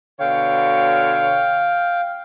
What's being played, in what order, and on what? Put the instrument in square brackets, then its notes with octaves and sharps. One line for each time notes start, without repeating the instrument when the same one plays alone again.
[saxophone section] B2 D3 C#5 [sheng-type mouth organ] F5 G5